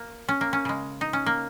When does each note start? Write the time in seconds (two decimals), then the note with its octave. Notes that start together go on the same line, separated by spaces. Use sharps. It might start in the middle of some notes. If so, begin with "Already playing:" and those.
Already playing: A#3
0.29 C#4
0.41 A#3
0.53 C#4
0.65 C#3 G#3
1.01 D#4
1.13 C#4
1.26 A#3